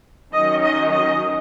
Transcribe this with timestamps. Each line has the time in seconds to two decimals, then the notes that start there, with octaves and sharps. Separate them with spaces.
0.32 D#3 F#3 C#4 D#5
0.62 D#5
0.91 D#5